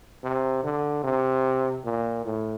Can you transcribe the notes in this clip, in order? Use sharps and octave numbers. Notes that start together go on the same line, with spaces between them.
C3
D3
C3
A#2
A2